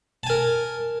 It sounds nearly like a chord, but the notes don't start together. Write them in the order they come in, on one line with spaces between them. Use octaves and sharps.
A5 G#5 A#4